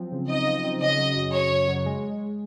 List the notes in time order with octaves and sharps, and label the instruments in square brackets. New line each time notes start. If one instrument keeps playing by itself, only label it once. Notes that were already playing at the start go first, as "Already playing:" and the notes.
Already playing: [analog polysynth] F3 F#3 C4
C#3
[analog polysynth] D#4 [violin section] D#5
[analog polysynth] F3
C4
[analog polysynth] C#3 [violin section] D#5
[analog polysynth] F#3
F#2
[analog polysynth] F#2 [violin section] C#5
[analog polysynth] C#3
F#3
G#3